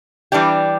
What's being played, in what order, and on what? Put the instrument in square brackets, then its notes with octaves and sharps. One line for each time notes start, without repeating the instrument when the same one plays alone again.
[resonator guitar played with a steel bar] E3 G3 D4 G4